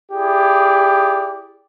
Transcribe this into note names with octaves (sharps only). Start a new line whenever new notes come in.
E4 G4 G#4 D5